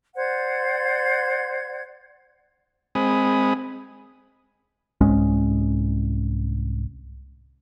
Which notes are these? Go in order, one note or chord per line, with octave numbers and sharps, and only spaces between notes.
C5 D5 F#5 G#6
G#3 C4 G#5 B5 D#6
C2 G#2 G#3 C#4